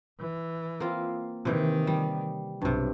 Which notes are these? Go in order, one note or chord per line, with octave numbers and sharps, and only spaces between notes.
E3
A#3 C4 F4
C3 D#3 E3
G3
B1 G2 C3